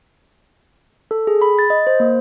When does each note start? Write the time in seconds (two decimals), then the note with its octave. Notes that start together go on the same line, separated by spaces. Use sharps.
1.11 A4
1.27 G#4
1.41 B5
1.59 A6
1.70 D#5
1.87 C5
2.00 A#3